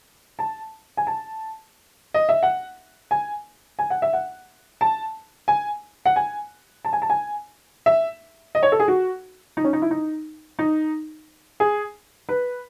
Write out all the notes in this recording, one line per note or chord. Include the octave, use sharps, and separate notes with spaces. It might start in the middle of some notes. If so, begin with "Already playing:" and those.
A5
G#5
A5
D#5
E5
F#5
G#5
G#5
F#5
E5
F#5
A5
G#5
F#5
G#5
A5
G#5
A5
G#5
E5
D#5
C#5
A4
G#4
F#4
D#4
C#4
D#4
E4
D#4
D#4
G#4
B4